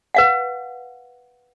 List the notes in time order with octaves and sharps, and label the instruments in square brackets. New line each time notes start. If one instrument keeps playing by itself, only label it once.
[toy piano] B4 F5 F#5